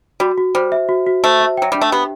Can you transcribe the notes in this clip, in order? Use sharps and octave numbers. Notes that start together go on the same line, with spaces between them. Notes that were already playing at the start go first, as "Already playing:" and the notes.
G3 F#4
F#4
G3 C5
E5
F#4
F#4
A3 C5
E5
F#3 G5
G3 D4
A3
B3 G4